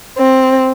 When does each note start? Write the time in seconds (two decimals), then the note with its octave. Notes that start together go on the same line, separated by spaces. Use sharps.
0.18 C4